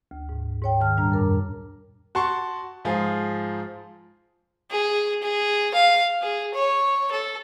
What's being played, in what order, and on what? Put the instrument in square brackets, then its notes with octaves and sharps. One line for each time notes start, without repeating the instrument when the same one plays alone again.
[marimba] D2
G#2
G#2 C#5 G5
D#3 A5 F6
A#2 G3 D4 A#5
F#2 A#4 D6
[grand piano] F#4 A5 C6 C#6
G#2 F3 F4 G#4
[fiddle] G#4
G#4
F5
G#4
C#5
A4